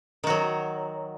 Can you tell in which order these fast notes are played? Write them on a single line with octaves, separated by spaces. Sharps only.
D#3 F#4 F#3